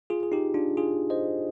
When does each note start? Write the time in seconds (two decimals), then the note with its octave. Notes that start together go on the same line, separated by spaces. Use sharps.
0.10 F4 G#4
0.23 G#4
0.32 D#4 G4
0.54 D4 F4
0.77 F4 G#4
1.10 C5 D#5